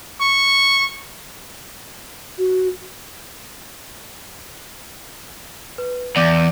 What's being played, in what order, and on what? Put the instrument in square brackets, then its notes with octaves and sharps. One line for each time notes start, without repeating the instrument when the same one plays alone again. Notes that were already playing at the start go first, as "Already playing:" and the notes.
[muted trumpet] C#6
[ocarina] F#4
[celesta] B4
[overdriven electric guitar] E2 [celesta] D5 D6 G6